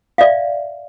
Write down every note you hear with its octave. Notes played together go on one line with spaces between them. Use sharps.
D5 E5 F5